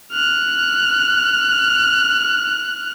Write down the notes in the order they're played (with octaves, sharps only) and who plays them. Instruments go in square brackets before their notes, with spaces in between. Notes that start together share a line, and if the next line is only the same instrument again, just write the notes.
[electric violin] F6 F#6